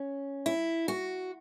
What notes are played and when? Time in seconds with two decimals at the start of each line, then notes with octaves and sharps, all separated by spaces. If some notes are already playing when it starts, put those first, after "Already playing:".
Already playing: C#4
0.46 E4
0.88 F#4